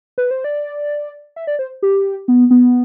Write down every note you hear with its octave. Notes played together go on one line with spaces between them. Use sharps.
B4
C5
D5
E5
D5
C5
G4
B3
B3